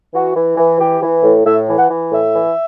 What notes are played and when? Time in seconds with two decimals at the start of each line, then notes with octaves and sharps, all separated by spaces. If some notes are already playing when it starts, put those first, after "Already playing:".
0.14 E3 F#4
0.36 E3
0.57 E3
0.79 E3 G4
1.02 E3
1.23 A2
1.45 A2 E5
1.68 E3
1.79 F#5
1.90 E3
2.12 A2 E5
2.34 E3